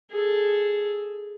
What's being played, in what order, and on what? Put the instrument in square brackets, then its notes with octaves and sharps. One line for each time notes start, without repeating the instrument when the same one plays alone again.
[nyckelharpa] G#4 A4